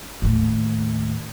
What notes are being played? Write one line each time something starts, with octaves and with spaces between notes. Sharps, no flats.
D#2 A2